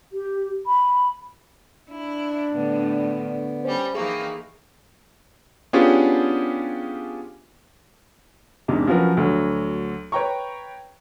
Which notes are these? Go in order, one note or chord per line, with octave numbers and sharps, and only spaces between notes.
G4
B5
D4 E4
A2 D3 B3
G3 C#4 C5
E3 A#3 D#4 G#4 G5 C#6
B3 C#4 D4 F4 G4 G#4
E2 G#2 C3 A#3 D4
F3 F#3 C#4 F#4 A#4 B4
D2 F#3
B4 C#5 G5 A#5 C#6